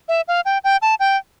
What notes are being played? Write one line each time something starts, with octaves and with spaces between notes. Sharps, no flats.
E5
F5
G5
G5
A5
G5